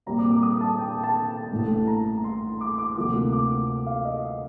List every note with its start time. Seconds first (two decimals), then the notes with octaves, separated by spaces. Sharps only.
0.06 A#1 A#2 G3 C4 A#5
0.19 D6
0.31 D6
0.43 D#6
0.61 A5
0.79 G5
0.91 A5
1.03 A5
1.51 A1 A2 A3
1.87 A#5
2.24 C6
2.61 D6
2.78 D6
2.96 D2 C3 F3 A#3 D6
3.33 D6
3.87 F5
4.05 D#5